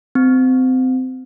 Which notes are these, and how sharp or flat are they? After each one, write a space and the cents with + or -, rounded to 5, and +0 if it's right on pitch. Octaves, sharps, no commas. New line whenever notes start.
C4 -25